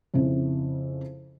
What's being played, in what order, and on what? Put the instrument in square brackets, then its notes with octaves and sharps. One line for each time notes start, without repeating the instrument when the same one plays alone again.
[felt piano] F2 C#3 E4